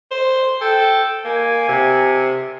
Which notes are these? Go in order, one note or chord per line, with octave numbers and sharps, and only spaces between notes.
C5
A4 G5
A#3 G#5
C3